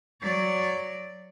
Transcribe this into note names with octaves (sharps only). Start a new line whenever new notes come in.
F#3 D5